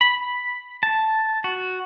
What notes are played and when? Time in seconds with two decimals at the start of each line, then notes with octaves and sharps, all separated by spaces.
0.01 B5
0.83 A5
1.44 F#4